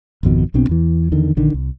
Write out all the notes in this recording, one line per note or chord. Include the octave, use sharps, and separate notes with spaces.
G#1 F2 B2 D#3
B1 B2 C4 D4
E2 E3
E2 D3 D#3
A#1 D3 D#3
C2